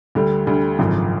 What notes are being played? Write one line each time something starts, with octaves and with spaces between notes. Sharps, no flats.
D2 D3 G3
D2 D3 G3
G#1 F#2 C#3 F3